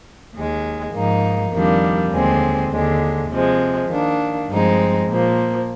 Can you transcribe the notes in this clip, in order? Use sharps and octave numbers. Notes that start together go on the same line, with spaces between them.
D#2 D#3 G#3
G#2 F3 A#3 D#4
F2 D#3 G3 A#3 D4
D#2 D3 G#3 C4
D#2 D3 G#3
C3 F3 G#3
D#3 A#3 D4
G2 F3 G#3 C4 D#4
A#2 F3 A#3